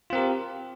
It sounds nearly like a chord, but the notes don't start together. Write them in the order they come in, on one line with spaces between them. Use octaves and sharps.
F4 C4 A#4 G4